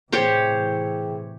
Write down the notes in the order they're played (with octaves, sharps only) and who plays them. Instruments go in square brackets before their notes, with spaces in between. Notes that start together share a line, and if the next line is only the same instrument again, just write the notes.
[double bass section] A2 C3 E3 [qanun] G4 C5 C#5 [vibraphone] G#4 G5